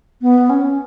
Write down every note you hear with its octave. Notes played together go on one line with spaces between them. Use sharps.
B3
C#4